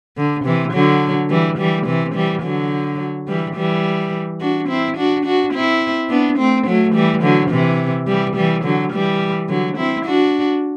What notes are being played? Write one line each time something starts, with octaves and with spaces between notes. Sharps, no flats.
D3
C3 E3
D3 F#3
E3 G3
E3 G3
C3 E3
E3 G3
D3 F#3
E3 G3
E3 G3
D4 F#4
C4 E4
D4 F#4
D4 F#4
C4 E4
B3 D4
A3 C4
F#3 A3
E3 G3
D3 F#3
C3 E3
E3 G3
E3 G3
D3 F#3
E3 G3
D3 F#3
C4 E4
D4 F#4